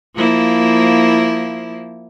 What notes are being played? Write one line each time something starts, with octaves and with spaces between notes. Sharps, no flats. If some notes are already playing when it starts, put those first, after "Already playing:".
F3 A#3 E4